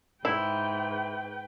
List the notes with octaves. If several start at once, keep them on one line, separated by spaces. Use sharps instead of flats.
G#2 E4 B4 G5